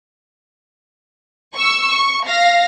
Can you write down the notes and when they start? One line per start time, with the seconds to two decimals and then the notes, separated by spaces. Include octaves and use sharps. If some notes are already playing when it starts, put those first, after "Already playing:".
1.55 C#6 E6
1.88 C#6
2.25 F5 A#6